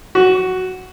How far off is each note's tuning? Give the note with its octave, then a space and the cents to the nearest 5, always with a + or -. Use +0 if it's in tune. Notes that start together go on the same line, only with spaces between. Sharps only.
F#4 +5